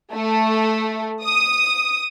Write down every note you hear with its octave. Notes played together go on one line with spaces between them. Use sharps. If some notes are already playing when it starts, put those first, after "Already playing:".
A3
D#6